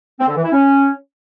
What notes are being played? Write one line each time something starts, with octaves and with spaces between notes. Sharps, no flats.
C4
D3
E3
E4
C#4